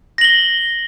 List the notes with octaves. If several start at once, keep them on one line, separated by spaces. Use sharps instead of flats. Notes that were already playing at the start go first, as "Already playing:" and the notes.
A#6 F#7 G7